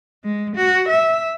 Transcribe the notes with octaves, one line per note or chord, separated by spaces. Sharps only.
G#3
F#4
E5